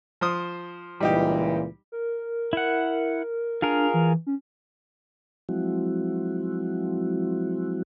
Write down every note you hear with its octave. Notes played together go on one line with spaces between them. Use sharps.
F3 C5 D#6
C#2 A#2 E3 G3 D#4 G4
A#4
E4 F#5
D4 F4 G#4 A#4
E3
C#4
F3 F#3 G#3 C4 E4 F#4